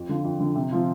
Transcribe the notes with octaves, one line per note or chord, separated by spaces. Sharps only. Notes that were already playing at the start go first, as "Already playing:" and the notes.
Already playing: F2
D3 F3
F2
D3 F3
C3
F3 C4 F4